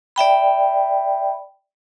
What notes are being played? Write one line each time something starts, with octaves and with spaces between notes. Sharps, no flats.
D5 E5 G5 B5